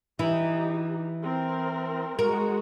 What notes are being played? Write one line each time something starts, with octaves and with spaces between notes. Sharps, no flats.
E3 D#4 E4 G4
C4 A#4
G#3 F#4 A#4